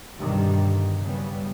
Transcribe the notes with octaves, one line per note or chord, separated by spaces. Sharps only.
G2 B2 D3 D#3 G3
F#2 C#3 G3 B3